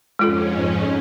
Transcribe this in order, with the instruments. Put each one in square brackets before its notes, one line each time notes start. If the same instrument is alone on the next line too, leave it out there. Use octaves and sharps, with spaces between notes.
[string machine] F2 G#2 C#4 [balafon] G#3 F4 A4